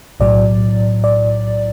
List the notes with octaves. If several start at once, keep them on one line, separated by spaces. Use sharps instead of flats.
B1 A2 F#3 D5
D5